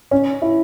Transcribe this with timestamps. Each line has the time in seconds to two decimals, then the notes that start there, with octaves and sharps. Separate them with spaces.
0.11 C#4
0.42 E4